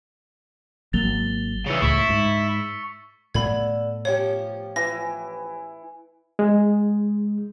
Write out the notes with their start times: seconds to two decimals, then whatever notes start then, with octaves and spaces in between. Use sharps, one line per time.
0.93 G#1 F#3 A#3 A6 F7 G7
1.67 C#3 E3 E6 C#7 F7
1.82 C#2 A2 E4 C#6 B6
2.10 G#2
3.34 A2 D3 A3 B3 B5 G#6
4.05 F3 C#4 G4 C#5
4.76 E3 A#6
6.39 G#3